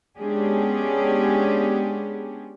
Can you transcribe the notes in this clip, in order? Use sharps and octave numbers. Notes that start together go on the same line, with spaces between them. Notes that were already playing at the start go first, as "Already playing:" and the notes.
G#3 B3 C#4 D4 G4 G#4